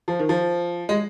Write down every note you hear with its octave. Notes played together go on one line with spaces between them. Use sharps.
F3
D#3
F3
G#3